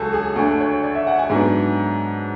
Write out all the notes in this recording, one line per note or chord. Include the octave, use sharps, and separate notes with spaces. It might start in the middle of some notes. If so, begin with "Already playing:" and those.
Already playing: C#2 C#3 F#3 A4 G#5
G#4
D2 D3 A3 A4
C#5
D5
E5
F#5
G#5
G#2 F#3 B3 D4